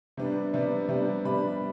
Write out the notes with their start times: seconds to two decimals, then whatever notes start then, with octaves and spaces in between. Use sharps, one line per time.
0.17 C3 G3 B3 D4
0.54 C3 G3 B3 D4
0.88 C3 G3 B3 D4
1.25 C3 G3 B3 D4 B5